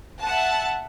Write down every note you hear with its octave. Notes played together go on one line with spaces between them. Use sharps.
E5 F#5 A5